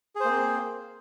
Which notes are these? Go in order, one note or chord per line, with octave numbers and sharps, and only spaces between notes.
A#3 C4 G#4 C5